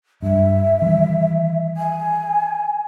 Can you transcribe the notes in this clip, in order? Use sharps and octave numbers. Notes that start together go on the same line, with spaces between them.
G2 E5
D#3 E3 G3
G#5